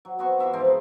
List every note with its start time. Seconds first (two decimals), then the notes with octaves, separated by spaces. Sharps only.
0.05 F#3
0.19 B3 C4 F#4 C#6
0.39 E3 F4 E5 A#5
0.53 G#2 F3 C4 A#4
0.64 G#4 B4